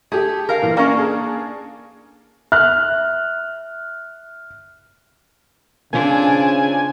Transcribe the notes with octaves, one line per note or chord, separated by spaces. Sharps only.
A3 G4 G#4
A#4 F5
A#2 E3
A#3 C#4 A#4 D5 F5
D4 G#4
E5 F6 F#6
C#3 C4 D4 F4 C5 G#5